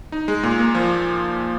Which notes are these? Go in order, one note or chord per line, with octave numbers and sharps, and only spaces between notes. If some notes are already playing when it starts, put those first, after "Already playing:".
D#4
G#3
A#2
A#3
F3